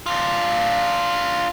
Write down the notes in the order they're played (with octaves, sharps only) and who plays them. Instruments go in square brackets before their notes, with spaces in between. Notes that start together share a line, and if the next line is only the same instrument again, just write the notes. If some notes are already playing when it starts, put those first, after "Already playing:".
[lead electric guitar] D4 F4